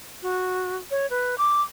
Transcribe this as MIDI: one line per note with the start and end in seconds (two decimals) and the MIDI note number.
0.22 0.77 66
0.91 1.09 73
1.10 1.35 71
1.38 1.61 86